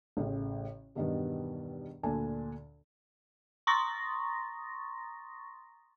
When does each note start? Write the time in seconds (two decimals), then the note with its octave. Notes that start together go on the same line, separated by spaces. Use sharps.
0.17 A1 A2 C#3
0.95 E2 G2 B2 D#3 G3 B3
2.03 D2 A#2 D3 D4 G#5
3.67 A#5 C6 C#6 D#6 A6 A#6